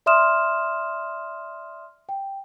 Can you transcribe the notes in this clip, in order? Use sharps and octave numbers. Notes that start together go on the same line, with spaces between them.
D5 E5 C6 D#6 F6 E7
G5